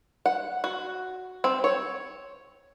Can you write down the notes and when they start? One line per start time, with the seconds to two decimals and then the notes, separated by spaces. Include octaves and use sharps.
0.26 F#5
0.64 F#4
1.44 C4
1.64 C#5